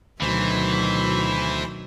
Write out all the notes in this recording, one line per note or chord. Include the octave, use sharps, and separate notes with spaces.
D2 B2 D#3 E3 F#3 C5